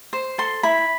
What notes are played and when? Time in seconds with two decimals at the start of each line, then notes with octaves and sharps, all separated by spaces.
0.13 C5
0.38 A4 C6
0.63 E4 B5